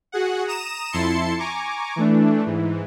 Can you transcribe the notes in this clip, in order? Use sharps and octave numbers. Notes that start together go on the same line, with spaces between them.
F#4 G#4 F#5
A#5 D#6 E7
F2 E4 A5 C6 C#7
G#5 A#5 C#6 D6
E3 A3 D4
G#2 E3